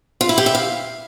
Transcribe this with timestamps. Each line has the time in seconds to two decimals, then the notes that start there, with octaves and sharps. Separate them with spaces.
0.21 F4
0.29 E4
0.38 G4
0.46 E5
0.55 F5